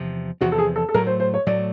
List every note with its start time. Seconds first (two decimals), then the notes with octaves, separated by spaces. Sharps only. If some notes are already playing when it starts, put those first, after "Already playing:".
Already playing: E2 C3 F3
0.41 E2 C3 F3 F#4
0.52 A4
0.58 G#4
0.76 A4
0.89 A4
0.94 A2 F#3 A3 A#4
1.07 C5
1.20 C5
1.34 C#5
1.46 A2 F#3 A3 D5